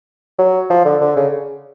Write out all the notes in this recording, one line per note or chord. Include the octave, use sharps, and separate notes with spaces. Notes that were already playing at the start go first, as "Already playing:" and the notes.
F#3
F3
D3
D3
C#3